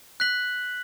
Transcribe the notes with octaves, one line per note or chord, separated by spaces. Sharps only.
F#6 B6 F#7